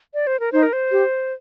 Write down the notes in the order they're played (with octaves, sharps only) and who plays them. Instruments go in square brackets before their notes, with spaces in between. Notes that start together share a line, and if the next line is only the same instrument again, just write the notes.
[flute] D5
C5
A#4
[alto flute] D#4 [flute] C5
[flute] A#4
C5
[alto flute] G4